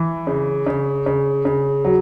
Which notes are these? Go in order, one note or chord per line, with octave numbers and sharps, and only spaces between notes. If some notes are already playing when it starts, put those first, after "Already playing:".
Already playing: E3
C#3
C#3
C#3
C#3
F#3